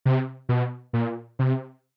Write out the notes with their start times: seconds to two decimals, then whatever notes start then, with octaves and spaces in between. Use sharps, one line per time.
0.05 C3
0.49 B2
0.93 A#2
1.39 C3